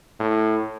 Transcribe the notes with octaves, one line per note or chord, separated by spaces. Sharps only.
A2